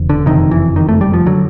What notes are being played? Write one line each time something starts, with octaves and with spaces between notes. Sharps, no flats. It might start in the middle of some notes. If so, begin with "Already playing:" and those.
Already playing: E1 E2 C#3
D3
F#1 F2 C3 D#3
E3
D#3
A3
G3
F3
D3 F#3